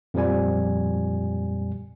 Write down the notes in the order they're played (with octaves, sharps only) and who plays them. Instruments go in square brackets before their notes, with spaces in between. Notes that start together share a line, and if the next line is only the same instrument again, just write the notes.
[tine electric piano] F2 A#2 F3 G3 G#5